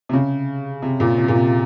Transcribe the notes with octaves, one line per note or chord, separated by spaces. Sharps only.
C3
C#3
C3
A#2
C3
A#2
C3